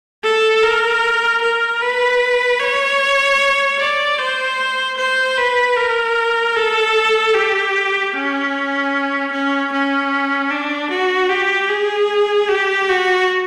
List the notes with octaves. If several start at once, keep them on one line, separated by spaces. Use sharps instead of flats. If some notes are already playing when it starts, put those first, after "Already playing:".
A4
A#4
A#4
B4
C#5
D5
C5
C5
B4
A#4
A4
G4
C#4
C#4
C#4
D4
F#4
G4
G#4
G4
F#4